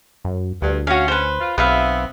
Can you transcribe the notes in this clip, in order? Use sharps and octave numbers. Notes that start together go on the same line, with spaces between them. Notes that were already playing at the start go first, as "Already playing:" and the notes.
F#2
D2 G2
C#4 F#4 F5
B4 C5
F4
B1 B3 C4 B4 E5 F5